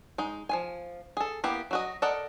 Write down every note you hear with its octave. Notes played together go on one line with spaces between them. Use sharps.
G#3 D#4
F3 F4 G#5
G#4 A4
A#3 B3 E4 G4
F#3 F#4 D#5
A4 A#4 D5 D#5 F#5